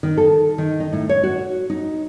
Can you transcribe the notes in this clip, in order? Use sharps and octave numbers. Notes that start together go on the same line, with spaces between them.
D#3
A4
D#3
D#4
A2
C#5
F#4
D#4